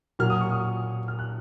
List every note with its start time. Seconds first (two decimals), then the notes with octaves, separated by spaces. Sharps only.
0.19 A#2 F#3 A#3 F6
0.30 D#6
0.41 C#6
0.51 D#6
1.08 F6
1.19 F#6